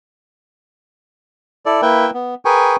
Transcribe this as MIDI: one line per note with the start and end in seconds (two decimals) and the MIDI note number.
1.66 1.81 64
1.66 1.81 69
1.66 1.81 74
1.82 2.10 58
1.82 2.10 64
1.82 2.10 71
1.82 2.10 76
1.82 2.10 79
2.14 2.35 59
2.45 2.76 68
2.45 2.76 70
2.45 2.76 71
2.45 2.76 79
2.45 2.76 80
2.45 2.76 85